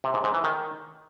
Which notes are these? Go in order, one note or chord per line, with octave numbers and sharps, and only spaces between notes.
C3
G#2
G#2
E3
D#3